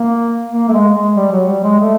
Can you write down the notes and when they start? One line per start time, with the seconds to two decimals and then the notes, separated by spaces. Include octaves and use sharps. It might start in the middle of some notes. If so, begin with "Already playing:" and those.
Already playing: A#3
0.52 A#3
0.68 A3
0.73 G#3
0.94 G#3
1.16 G3
1.31 F#3
1.47 G3
1.63 G#3
1.79 A3